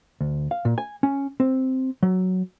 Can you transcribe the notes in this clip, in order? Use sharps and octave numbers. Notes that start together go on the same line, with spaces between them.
D2
F5
A#2
G#5
C#4
C4
F#3